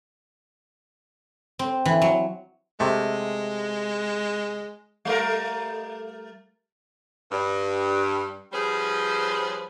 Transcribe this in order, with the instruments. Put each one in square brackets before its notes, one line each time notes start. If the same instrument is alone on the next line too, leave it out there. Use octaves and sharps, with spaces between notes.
[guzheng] C4
E3
F#3
[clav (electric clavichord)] C3 A3 [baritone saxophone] G#3
[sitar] G3 A3 A#4
[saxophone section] G2
F3 G3 C#4 G#4 B4 C5